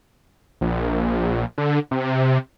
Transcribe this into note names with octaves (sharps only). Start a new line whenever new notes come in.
A#1
D3
C3